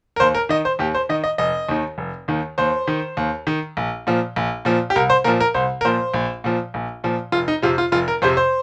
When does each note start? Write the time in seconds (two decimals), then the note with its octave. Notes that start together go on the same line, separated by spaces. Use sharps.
0.16 A#4
0.20 D#2 C5
0.35 A#4
0.49 D#3 D#5
0.65 C5
0.79 D#2 G4
0.94 C5
1.09 D#3 D#5
1.24 D#5
1.38 F1 D#5
1.69 D#2 D#3
1.98 F1
2.28 D#2 D#3
2.58 D#2 C5
2.87 D#3
3.17 D#2
3.47 D#3
3.77 A#1
4.07 A#2 F3
4.36 A#1
4.65 A#2 F3
4.90 G4
4.96 C2 A#4
5.10 C5
5.24 A#2 F3 A#4
5.40 A#4
5.54 C2 C5
5.81 A#4
5.85 A#2 F3 C5
6.14 A#1
6.44 A#2 F3
6.74 A#1
7.04 A#2 F3
7.32 F1 F4
7.48 D#4
7.62 F2 C3 F4
7.78 F4
7.92 F1 F4
8.08 A#4
8.22 F2 C3 C5
8.37 C5